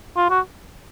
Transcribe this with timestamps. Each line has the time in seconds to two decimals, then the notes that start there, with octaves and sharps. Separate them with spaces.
0.16 F4
0.30 F#4